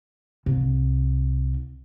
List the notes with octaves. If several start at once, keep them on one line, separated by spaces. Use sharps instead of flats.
C2